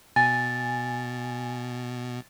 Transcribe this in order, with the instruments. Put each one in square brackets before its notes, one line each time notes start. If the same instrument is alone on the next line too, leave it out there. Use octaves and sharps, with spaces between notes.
[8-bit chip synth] B2 [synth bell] G#5 [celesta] A6